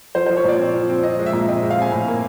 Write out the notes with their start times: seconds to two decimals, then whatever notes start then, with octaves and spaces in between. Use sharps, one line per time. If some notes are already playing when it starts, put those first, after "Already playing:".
0.15 F3 C5
0.26 F3 C5
0.37 C#5
0.44 A#2 D5
0.59 C4
0.74 F3
0.89 C4
1.03 F3 D#5
1.19 G#3
1.26 E5
1.33 A#2
1.48 C4 D#5
1.62 G#3
1.70 F5
1.78 C4 G#5
1.92 A2
2.08 A#3